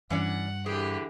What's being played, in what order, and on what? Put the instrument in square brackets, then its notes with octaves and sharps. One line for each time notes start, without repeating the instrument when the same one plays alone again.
[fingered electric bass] G2 [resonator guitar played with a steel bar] E3 C#4 D5 [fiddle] F#5
[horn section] D3 E3 [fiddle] G4 [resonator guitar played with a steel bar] G#4